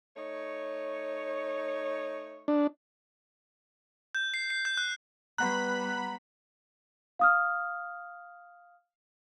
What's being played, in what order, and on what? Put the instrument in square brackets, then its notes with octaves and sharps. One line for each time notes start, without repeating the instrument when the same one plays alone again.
[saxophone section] A3 D#4 C#5
[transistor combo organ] D4
[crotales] G6
C7
C7
G6
F#6
[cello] G3 B3 [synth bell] B4 F#5 A#5 [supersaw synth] B5 [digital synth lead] F#6
[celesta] F5 D#6 F6